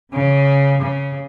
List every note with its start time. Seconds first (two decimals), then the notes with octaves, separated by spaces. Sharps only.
0.12 C#3
0.80 C#3